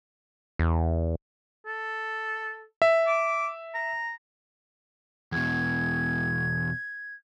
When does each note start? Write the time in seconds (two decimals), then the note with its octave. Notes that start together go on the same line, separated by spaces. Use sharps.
0.59 E2
1.66 A4
2.82 E5
3.07 D6
3.74 A#5
5.32 E2 B2 G#6